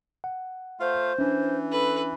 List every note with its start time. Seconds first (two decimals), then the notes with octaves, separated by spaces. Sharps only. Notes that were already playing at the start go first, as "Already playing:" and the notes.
0.24 F#5
0.80 A3 F4 C5 F5
1.19 E3 C#4 D4
1.72 A4 B4